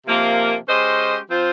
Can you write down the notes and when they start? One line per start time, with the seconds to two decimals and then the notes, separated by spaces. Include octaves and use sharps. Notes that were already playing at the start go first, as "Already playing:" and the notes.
0.06 C3 F3 A#3
0.68 G#3 C#4 G4 C5 D#5
1.31 F3 C4 F4 C5